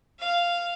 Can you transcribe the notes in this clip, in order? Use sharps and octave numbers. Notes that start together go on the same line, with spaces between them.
F5